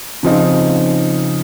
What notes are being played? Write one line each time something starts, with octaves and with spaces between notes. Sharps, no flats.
C#3 F3 C4 D#4